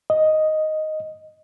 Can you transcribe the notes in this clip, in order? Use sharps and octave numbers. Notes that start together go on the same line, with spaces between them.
D#5